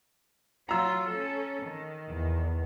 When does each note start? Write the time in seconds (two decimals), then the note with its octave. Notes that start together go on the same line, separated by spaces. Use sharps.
0.69 F#3 F4 A#5 E6
1.09 C#4 A4
1.63 D#3
2.09 E2